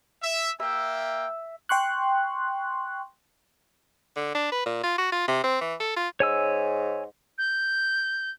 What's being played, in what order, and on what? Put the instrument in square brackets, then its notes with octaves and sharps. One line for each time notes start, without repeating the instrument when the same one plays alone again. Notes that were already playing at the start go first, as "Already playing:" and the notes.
[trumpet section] E5
[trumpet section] A#3 G5 [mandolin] E5
[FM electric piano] G5 C6 C#6 F#6
[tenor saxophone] D3
D4
B4
A#2
F4
F#4
F4
C3
C4
E3
A4
F4
[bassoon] G#2 [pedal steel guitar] C#5 G#5 E6
[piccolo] G6